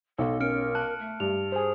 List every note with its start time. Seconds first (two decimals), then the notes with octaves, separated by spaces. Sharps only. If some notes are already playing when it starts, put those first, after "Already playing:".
0.18 B1 A4
0.41 C#4 A#4 F6 C#7 D7
0.75 A5 F#6
0.99 A3
1.20 G2 F7
1.52 G#4 C5 G#5